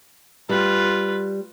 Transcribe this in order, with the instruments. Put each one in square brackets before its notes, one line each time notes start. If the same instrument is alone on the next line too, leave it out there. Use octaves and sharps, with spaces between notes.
[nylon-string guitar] G3 [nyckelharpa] F4 B4